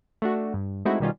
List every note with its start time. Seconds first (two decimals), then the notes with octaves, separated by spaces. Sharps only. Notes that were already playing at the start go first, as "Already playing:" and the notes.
0.22 A3 D4 F#4
0.54 G2
0.85 G#3 A3 C4 D#4 E4 F#4
1.00 B2 D#3 G3 C#4 F4